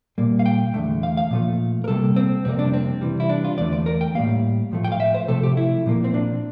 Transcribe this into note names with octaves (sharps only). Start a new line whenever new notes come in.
A#2 G3 A#3
F5
G5
E2 D3 F3 A3
F5
F5
A#2 F3 A3
A#4
C3 G3 A#3 A4
C4
F2 C3 G3 A#3 C4
D4
C4
C3 E3 G3
E4
D4
F4
E2 D3 A3 D5
D5
A#4
G5
A2 G3 A#3 F5
A2 F3 A3
G5
F5
E5
C5
C3 F3 A3 A4
G4
E4
A#2 F3 A#3
C4
D4